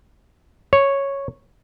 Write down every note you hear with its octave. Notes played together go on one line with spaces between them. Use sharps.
C#5